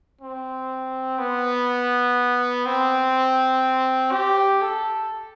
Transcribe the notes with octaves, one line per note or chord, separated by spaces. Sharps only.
C4
B3
C4
G4
A4